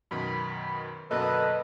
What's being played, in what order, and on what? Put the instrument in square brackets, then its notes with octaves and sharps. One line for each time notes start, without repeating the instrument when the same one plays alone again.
[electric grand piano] F#2 B2 D#3 [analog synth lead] B5
[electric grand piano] F#2 B2 A#3 [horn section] D3 A4 B4 [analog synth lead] D#5